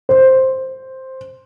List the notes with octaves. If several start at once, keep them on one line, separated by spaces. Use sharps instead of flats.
C5